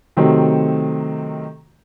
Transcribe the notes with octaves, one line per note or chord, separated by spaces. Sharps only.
C3 D#3 F#3 A3 C4